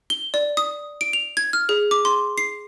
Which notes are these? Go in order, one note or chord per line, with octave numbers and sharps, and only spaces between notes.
G7
D5
D#6
D7
F7
G#6
F6
G#4
D6
C6
C7